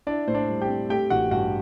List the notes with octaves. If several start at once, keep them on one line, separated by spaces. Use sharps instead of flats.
D4 E4 D5
A2 C5
D4 D5
G3
G4 G5
C4
A3 G4 G5
A1 F#4 F#5
G2 F#4 F#5